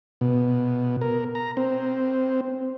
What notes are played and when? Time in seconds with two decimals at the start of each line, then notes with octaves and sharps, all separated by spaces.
0.21 B2
1.01 A#4
1.35 A#5
1.57 C4